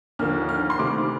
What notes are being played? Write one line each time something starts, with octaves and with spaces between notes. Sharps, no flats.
D#2 D3 F3 F6
F6
C6
D2 C3 D#3 D6